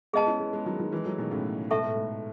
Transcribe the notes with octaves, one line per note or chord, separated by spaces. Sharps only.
G#3 B3 G#4 D#5 A5
C#4 E4
G#3 B3
G#3 B3
D#3 F#3
D#3 F#3
E3 G#3
F#3 A3
B2 D#3
A2 C#3
G#2 B2 A4 E5 A5 C#6
A2
G#2